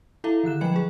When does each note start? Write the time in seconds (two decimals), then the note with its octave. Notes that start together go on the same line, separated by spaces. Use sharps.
0.24 E4 A4 E5 F5 A#5
0.43 D3 D#3 F#6 E7
0.61 F3 F#3 D#5 G5 B5 C#7
0.74 F#3 G#4